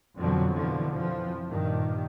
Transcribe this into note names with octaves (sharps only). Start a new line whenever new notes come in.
F2 B2 D3 F3 F#3
B2 D3 E3 F3
F2 E3 F3
G2 A#2 D#3